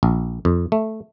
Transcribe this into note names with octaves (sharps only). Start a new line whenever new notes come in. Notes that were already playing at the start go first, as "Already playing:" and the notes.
A#1
F2
A3